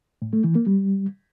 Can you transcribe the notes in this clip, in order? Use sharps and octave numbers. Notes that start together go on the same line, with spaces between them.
A2
A3
E3
A#3
G3